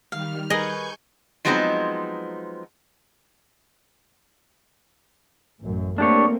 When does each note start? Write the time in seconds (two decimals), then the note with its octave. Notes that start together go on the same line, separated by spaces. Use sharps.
0.12 D#3 G3 F5 F6
0.50 G#4 A#4 B4 D#5 G#5 C#6 G6
1.45 F3 F#3 G#3 B3 C4 D#4
5.62 A1 F#2
5.98 A3 A#3 C4 D4 G4 C#5